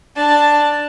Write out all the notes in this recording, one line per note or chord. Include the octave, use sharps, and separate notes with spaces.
D4 A5